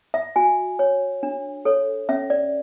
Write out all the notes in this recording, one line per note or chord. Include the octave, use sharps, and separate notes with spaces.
E5
F#4 G#5
C#5
D4
A4 C#5
C#4 E5
D5